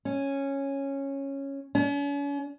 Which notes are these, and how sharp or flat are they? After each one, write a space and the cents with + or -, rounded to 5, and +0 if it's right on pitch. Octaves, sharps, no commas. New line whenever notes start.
C#4 -10
C#4 +40